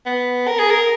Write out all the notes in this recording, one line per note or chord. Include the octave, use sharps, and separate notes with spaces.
B3
A#4
G#4
A#4